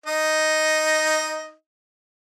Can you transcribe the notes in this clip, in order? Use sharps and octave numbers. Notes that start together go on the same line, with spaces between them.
D#4 D#5